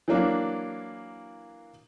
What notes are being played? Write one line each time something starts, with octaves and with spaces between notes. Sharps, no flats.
E3 F#3 A#3 D4